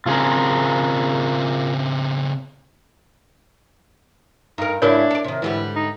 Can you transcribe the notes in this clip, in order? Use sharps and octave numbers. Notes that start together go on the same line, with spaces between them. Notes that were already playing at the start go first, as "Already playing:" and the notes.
C#3 C4 F4 G#4 A#4
G2 D#4 A#4
G#2 C#3 D4 E4 F#4 A#4 C#5
A4 D5
C3 D#3
G#2 D3 E3 G3
D#4